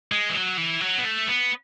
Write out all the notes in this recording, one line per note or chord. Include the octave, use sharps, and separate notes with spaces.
G#3
E3
F#3
E3
F#3
B3
A3
B3